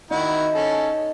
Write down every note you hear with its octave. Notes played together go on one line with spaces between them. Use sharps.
D#3 D#4 E4 F#4
C#4 A4